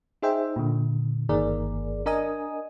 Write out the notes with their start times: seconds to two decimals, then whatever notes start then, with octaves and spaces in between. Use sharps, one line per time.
0.22 D#4 G#4 C5 E5 G5
0.56 A#2 D3
1.29 G1 D#3 A#3 G#4 A#4 D5
2.06 D4 A#4 D#5 G#5 D#6